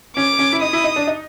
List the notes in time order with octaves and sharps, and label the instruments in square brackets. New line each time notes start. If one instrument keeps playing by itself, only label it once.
[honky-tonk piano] C#4 [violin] D6
[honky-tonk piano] C#4
E4
[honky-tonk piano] D#4 [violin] D#6
[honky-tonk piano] E4
D#4
D4
D#4